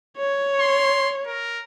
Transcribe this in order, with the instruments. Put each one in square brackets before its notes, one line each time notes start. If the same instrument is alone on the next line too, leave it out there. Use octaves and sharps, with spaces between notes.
[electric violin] C#5
[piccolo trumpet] C6
A#4